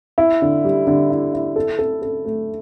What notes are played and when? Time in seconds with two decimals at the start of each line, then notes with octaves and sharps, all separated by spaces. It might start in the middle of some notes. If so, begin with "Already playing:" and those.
0.18 E4
0.42 D3
0.65 G3
0.87 D3
1.10 E4
1.33 E4
1.56 A4
1.79 A4
2.02 A4
2.25 A3